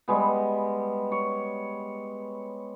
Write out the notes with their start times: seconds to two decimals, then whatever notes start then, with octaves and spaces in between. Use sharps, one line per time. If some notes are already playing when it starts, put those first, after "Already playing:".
0.08 G3 G#3 B3
1.12 C#5